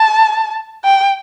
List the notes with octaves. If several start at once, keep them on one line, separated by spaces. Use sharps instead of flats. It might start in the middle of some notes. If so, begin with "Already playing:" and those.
Already playing: A5
G5